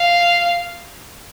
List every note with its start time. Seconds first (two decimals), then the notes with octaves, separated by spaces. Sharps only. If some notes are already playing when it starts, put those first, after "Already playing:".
Already playing: F5